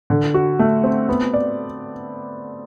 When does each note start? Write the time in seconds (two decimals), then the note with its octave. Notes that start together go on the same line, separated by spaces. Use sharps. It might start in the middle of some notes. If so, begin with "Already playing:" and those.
0.10 D3
0.34 F#4
0.59 A3
0.83 C4
1.09 B3
1.34 D5